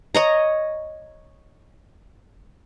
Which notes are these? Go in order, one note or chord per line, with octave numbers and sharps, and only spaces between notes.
C#5 D#5 A#5